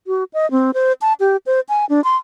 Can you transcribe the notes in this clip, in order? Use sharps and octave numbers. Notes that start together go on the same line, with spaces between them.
F#4
D#5
C4
C5
A5
G4
C5
G#5
D4
C6